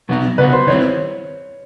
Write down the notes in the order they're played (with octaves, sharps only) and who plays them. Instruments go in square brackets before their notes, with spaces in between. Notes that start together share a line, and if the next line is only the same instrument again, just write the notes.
[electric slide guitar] B2 F#3 B3 D#4
[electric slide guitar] C#3 F#3 B3 D#4 F#4 [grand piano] B4
[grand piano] C5
[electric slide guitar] D#3 G3 C4 E4 [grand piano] C#5